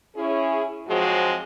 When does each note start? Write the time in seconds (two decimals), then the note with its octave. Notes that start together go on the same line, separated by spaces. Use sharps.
0.16 C#4 E4 G#4
0.87 G#2 F3 F#3 G#3 C4 F#4